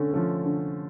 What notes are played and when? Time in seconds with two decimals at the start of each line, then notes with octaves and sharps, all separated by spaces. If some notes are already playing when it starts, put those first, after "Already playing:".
Already playing: D3 A3 C#4
0.12 F3 A3 C#4
0.45 D3